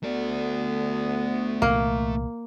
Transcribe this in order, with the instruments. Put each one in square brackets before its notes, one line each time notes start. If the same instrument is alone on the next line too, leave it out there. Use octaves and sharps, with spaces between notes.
[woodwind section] D2 B3 [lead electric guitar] A3 D5
[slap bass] C2 A#2 E3 [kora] A#3